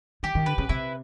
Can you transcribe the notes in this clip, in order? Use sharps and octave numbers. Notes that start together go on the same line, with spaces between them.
D#3 G4
D#3
D3 B4
C#3
C3 E4